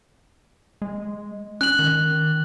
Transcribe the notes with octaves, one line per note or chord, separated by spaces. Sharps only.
G#3
C#4 F#6 F#7
D#3